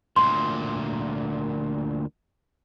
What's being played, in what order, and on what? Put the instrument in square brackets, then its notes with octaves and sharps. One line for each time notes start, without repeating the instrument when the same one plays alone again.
[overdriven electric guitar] D2 A#2 [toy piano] C6